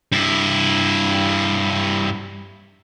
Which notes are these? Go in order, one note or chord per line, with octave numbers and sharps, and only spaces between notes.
G2 E4